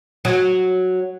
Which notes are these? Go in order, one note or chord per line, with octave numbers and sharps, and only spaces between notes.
F#3